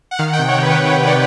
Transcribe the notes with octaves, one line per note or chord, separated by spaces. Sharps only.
F#5
D#3 F5
F#5
G5
C3
C#5
D#3 B4
D#3 C#5
C3
D5